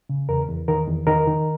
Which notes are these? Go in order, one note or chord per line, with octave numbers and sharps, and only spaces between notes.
C#3
E2 A#4
E2
D#3 A#4
E2
D#3 A#4
D#3